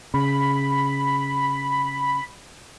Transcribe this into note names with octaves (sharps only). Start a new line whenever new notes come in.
C#3 B5